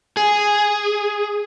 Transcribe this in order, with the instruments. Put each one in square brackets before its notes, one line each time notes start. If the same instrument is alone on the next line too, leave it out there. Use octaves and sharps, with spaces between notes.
[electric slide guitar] G#4